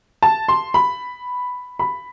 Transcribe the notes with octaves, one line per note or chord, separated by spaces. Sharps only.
A5
C6
B5
B5